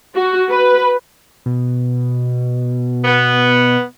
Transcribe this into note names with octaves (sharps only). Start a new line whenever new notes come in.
F#4
B4
B2
B3